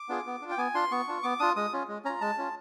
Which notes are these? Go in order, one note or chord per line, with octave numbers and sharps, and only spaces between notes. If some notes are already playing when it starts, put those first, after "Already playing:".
Already playing: D6
B3 D4 F4 G#4
B3
D4 F4
G5
B3 G#5
D4 F4 C6
B3 C#6
D4 F4
B3 D6
D4 F4 D#6
G#3 D#6
C#4 F4
G#3
C#4 F4 A#5
G#3 A5
C#4 F4